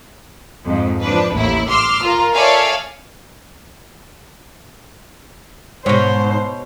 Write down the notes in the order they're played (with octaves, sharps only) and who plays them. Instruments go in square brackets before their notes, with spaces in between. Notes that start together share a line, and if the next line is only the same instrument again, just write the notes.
[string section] F2 G#2
F3 D4 B4
A1 D#2 E4
C6 D6 E6 F6
F4 A#4
A4 C#5 D5 E5 F5 G#5
[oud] G#2 [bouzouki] B2 C#5 [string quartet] C5